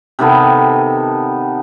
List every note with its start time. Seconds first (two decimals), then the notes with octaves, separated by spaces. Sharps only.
0.19 C3 D#3 B3 A4